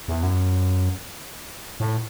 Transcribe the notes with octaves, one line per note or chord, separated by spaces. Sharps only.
E2
F#2
A2